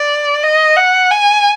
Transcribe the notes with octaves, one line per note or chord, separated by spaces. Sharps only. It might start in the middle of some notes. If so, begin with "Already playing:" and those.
Already playing: D5
D#5
F#5
G#5